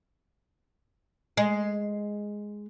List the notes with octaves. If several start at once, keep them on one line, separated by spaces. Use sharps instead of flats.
G#3